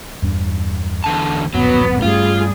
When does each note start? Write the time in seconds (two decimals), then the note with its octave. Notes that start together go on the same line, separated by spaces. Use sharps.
0.22 E2 G2 D4
1.04 E2 D3 A5
1.54 D1 A#1 F#2 F#3 B3
2.02 G2 G3 A3 C#4 F4 G#4